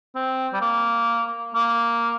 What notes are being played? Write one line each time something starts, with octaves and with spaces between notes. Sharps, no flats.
C4
G3
A#3
A#3